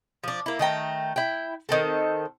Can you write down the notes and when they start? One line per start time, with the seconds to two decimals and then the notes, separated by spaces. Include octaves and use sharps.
0.24 F3 D4
0.46 A#3 E4
0.59 D#3 A3 G5 A#5
1.16 E4 G5
1.69 D#3 C4 A4